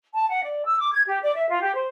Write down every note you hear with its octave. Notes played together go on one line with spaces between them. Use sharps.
A5
F#5
D5
E6
D6
G#6
G4
D5
E5
F4
G4
C5